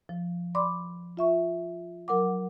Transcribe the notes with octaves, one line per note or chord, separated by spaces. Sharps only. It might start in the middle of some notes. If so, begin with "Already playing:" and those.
F3
D5 B5 C6 D6
F4 E5 C#6
F#3 A#4 F#5 D6